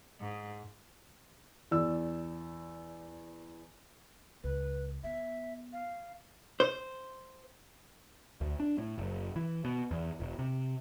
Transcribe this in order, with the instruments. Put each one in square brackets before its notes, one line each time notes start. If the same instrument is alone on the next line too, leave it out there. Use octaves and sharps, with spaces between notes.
[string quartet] G#2
[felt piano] E2 D5 E6
[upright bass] C#2 [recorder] B4
[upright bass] B3 [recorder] E5
[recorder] F5
[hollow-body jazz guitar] C5
[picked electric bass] D2
D4
A2
F#1
E3
B2
E2
E1
C3